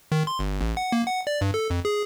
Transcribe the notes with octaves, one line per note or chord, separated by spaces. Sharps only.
D#3
C6
G1
A1
F#5
A#3
F#5
D5
G2
A4
F2
G#4